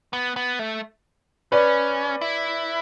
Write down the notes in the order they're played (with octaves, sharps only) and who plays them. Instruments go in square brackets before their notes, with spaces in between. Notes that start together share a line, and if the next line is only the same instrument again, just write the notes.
[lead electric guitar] B3
B3
A3
[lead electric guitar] C#4 [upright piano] B4 D5
[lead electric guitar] E4